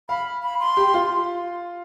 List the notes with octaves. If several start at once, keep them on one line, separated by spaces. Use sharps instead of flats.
F5 B5
B5
C6
G4
F4